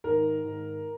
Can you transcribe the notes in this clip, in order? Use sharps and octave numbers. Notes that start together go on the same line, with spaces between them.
G#2 D#3 A#4
G#2 D#3